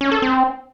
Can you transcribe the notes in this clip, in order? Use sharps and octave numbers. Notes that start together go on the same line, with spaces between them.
C#4
A4
C4